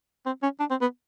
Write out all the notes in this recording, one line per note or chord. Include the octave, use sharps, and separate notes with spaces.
C4
C#4
D4
C4
B3